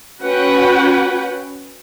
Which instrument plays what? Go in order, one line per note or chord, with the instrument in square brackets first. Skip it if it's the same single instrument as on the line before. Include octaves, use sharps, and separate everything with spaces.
[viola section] C#4 F#4 B4 F#5 G5